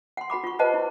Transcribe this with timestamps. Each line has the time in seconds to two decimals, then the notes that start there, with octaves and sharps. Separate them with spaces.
0.17 F#5 C6
0.30 F#4 F#5 B5 D6
0.44 F4 C#6
0.59 G4 B4 C5 D#5 F#5 A5
0.74 E4